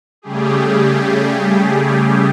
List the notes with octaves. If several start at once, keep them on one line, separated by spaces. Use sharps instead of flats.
C#3 G3 A3 G4 G#4